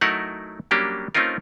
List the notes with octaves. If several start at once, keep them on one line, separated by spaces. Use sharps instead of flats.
F#3 A3 D#4 E4 A#4 F#5
F#3 G3 A#3 C#4 D4 G4
A3 C4 C#4 D#4 F4 A#4